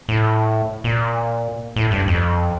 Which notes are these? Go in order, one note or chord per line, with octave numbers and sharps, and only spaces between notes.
A2
A#2
A2
G2
F2